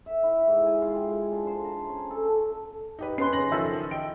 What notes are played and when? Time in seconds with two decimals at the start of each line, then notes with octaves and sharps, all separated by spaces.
0.06 E5
0.23 E4
0.47 G#2
0.66 G#5
0.82 F4
0.96 G5
1.09 G#3
1.32 D4
1.47 C5
1.64 A#5
1.89 C#4
2.11 A4
2.99 D#4 G4 B4
3.18 C#4 B4 C6 C7
3.33 C#3 A#6 F#7
3.52 D#3 F3 A4 E5
3.91 D#5 G5 D7